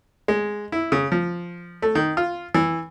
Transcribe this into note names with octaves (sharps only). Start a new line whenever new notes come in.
G#3
E4
C#3
F3
A3
D#3
F4
E3